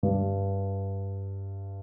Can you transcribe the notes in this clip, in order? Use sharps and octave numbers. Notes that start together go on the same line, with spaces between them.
G2